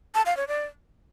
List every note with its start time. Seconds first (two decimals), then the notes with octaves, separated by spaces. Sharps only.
0.15 A5
0.26 F5
0.37 C#5
0.48 D5